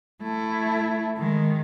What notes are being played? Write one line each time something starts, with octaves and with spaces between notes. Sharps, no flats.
A3 E4
D#3 G#3